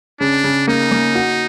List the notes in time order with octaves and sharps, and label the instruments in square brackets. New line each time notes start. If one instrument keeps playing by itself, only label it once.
[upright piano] C#3 [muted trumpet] D4
[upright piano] C#3
[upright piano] A#3 [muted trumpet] D#4
[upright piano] A#3
F#4